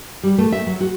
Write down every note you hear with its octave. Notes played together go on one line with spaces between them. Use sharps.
G3
A3
E5
F#3
F#4